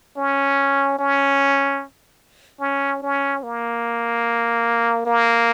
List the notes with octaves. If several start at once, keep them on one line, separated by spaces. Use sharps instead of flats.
C#4
C#4
C#4
C#4
A#3
A#3